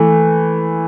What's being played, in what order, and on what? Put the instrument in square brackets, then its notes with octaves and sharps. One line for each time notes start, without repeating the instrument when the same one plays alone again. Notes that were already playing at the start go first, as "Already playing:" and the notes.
Already playing: [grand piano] E3 A3